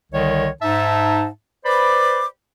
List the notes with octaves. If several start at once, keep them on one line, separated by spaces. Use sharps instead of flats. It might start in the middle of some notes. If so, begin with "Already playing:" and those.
C2 D3 D#3 C#5 D#5
G#2 D#4 E5 A5
B4 C5 D5 B5 D6